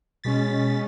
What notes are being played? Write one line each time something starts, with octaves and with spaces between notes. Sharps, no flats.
B2 G#3 C#4 A6 B6